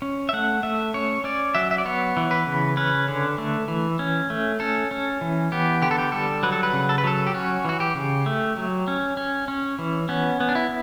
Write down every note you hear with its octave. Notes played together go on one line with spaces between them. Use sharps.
C#4
E5
A3 F#5
A3 E5
C#4 C#5
C#4 D5
F#3 E5
E5
D5
B3 C#5
E3
B4
C#3
C#4 B4
D3
A3
E3
C#4
A3
C#4 A4
C#4
E3
B3 G4
D3 G4
A4
G4
G3 A4
F#3 B4
A4
B4
C#3
A4
B4
F#3 A4
G4
C#4 F#4
E3 F#4
G4
C#3
A3
F#3
C#4
C#4
C#4
E3
B3 C#4
B3
D4
E4